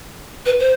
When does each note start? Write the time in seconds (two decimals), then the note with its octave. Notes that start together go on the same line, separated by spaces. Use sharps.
0.46 B4
0.60 C5